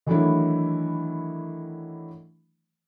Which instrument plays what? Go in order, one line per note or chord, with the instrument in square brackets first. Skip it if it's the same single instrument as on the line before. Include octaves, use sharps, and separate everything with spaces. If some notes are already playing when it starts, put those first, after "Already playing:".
[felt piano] D#3 E3 F#3 A3 D4 E4